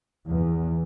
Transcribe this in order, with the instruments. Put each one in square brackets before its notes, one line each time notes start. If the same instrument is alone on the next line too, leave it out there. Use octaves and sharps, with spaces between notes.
[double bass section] E2